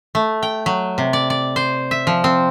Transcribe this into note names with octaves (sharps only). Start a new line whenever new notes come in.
A3
G5
F#3
C3
D5
D5
C5
E5
F3
C4